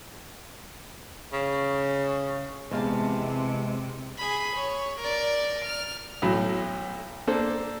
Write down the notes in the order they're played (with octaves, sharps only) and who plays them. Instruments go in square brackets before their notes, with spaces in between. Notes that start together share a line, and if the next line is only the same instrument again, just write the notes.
[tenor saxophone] C#3
[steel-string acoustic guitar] E2 F5 A5 [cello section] C3 [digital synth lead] G#3
[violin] G#4 B5
C#5
A#4 D5
F6
[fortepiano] B1 A2 F#3
A#3 D4 A4 C5